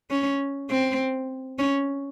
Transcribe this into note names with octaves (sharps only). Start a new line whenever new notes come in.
C#4
C4
C#4